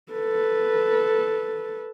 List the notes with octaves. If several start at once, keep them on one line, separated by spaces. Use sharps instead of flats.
A4 B4